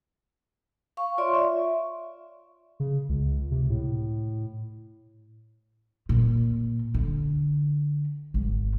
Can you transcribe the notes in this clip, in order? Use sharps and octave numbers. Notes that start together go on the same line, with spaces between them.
F5 C#6
F4 C#5 D5 E5 C6 C#6
E5
C#3
C#2
C3
A2
A#2
D3
G#1